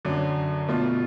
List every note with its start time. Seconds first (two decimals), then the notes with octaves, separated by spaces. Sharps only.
0.05 F#2 D3 F#3
0.69 B2 A3 F4